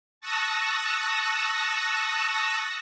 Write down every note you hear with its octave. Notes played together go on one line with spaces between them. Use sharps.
A5 C#6 D#6 E6 F#6 A#6